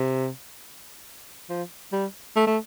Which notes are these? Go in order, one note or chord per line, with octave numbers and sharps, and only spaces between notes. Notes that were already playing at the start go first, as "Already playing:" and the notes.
Already playing: C3
F3
G3
A3
A3